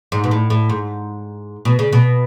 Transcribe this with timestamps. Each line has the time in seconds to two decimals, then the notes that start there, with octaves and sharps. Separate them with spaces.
0.12 G#2
0.24 B2
0.31 A2
0.50 A2
0.70 G#2
1.65 B2
1.79 C#3
1.93 B2